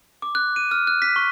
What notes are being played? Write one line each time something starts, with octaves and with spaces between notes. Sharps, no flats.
D6
F#6
D#7
F6
F#6
B6
C#6